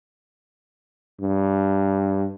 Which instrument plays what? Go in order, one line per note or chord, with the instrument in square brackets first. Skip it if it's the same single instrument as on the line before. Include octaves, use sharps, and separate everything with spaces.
[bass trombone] G2